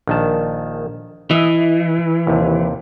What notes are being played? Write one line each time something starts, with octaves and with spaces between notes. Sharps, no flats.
A#1 D#3 A5
E3 D#5 E5
D#2 C3